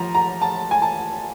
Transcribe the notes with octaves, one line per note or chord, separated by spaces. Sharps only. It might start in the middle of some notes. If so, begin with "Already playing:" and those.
Already playing: F3 A#5
A#5
A5
G#5
A5